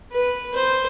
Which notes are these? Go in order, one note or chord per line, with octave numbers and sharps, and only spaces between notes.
B4
C5